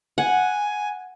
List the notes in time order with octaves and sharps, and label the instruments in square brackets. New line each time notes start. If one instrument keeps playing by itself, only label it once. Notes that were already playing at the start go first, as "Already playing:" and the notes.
[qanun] F#5 [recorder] G#5